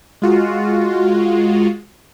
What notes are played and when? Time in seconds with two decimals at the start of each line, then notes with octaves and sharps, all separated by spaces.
0.22 G#3 F4 F#4